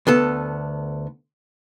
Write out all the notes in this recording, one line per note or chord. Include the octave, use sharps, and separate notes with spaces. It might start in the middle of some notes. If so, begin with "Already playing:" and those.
D2 B3 A4